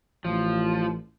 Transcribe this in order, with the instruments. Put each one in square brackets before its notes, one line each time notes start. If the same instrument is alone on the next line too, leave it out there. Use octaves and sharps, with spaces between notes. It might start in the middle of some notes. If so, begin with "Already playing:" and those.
[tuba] A1 [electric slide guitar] F3